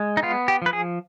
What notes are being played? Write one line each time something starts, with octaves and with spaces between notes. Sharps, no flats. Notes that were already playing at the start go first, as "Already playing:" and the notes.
Already playing: G#3
D#4
B3 F4
G4
F3 B4
G#4